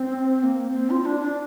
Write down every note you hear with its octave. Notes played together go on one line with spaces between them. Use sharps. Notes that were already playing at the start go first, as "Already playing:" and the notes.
Already playing: C4
A#3
C4
F4
F4
D4
D4